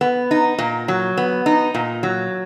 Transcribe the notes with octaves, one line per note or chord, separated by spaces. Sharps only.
B3
D#4
A#2
F#3
B3
D#4
A#2
F#3